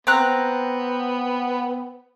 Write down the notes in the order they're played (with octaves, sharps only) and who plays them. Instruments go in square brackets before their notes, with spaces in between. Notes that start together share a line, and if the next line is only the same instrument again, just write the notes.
[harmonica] B3 [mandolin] C4 A#5 F#6